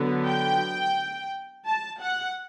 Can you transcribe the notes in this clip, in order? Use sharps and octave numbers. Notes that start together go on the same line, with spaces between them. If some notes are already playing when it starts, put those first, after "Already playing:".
Already playing: D3 F#3 B3
G5
A5
F#5